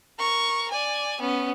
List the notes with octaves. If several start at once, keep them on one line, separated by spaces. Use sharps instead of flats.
A#4 C#6
D5 G#5
B3 C#4